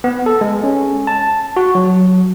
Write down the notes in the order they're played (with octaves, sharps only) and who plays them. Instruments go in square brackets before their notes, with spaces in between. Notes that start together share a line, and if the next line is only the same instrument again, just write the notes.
[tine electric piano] B3
A4
G#3
C#4
A5
F#4
F#3